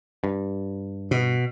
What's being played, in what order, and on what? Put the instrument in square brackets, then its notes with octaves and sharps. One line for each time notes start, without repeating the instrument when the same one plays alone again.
[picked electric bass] G2
[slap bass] B2